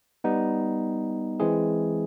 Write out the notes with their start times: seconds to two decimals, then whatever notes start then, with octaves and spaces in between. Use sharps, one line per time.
0.24 G3 B3 D#4
1.40 E3 G#3 C4 E4 G#4